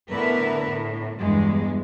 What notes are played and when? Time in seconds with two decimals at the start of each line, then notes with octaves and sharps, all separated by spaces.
0.11 A2 D3 B3 A#4 B4 E5
0.68 A2
1.20 E2 G2 G#3